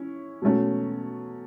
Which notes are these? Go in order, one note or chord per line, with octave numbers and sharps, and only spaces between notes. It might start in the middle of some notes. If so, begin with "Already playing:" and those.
Already playing: C#4 E4
B2 F#3 A3 C#4